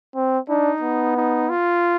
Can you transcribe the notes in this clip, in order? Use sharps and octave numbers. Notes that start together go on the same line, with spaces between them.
C4
D4 D#4
B3
D#4
F4